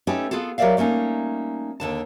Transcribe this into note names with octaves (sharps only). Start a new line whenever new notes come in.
A3 C#4 D#4 G4 A4 B4
B3 F4 G#4 A4
F#3 G4 A#4 D5 E5 F5
G3 A3 A#3 C#4 D#4
D#2 D3 A5